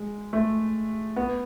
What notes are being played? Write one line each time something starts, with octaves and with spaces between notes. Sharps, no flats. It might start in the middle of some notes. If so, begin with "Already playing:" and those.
Already playing: G#3
A3
B3